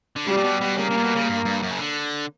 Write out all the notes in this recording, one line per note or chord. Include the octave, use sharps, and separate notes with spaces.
D3
C#3 G3
A#2
B2
B2
C#3 A#3
C#3
A#2
B2
C#3
G2
G2
F#2
C#3
D3